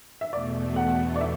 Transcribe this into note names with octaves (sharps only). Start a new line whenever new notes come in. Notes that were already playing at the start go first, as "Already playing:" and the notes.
E5
E2 B2 A3 D5
F#5
D5
E5